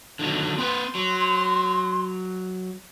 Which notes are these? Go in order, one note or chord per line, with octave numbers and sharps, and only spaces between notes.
D3 D#3 F#3
C4 B4 C6
F#3